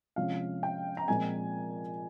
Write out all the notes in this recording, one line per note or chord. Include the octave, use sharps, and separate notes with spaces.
C3 F3 G#3 C#4 F5
G5
A#5
A#2 F3 G#3 C4 G#5